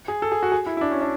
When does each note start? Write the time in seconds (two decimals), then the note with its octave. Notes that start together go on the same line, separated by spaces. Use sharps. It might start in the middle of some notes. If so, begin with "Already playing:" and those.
0.08 G#4
0.22 A4
0.32 G#4
0.43 F#4
0.52 G#4
0.66 E4
0.77 E4
0.81 D4
0.91 C#4
1.01 D4